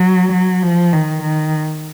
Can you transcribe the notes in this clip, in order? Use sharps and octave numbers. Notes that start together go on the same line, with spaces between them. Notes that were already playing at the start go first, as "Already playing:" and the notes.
Already playing: F#3
F#3
F3
D#3
D#3